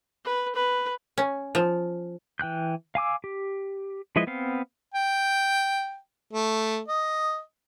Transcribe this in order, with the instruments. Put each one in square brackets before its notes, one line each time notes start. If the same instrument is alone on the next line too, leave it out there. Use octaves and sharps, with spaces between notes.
[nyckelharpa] B4
B4
[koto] C#4
F3
[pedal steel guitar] E3 G5 F#6 G6
F5 G#5 D6 E6
G4
F3 G#3 E4 B4 D#5
B3 C4 F5
[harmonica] G5
A3
D#5